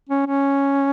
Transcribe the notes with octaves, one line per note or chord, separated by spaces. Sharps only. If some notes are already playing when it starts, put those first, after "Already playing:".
C#4
C#4